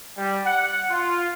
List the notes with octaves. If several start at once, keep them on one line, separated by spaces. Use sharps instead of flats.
G3
F#5
F4